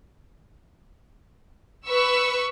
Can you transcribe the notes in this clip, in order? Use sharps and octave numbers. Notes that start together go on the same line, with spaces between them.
B4 C#6 E6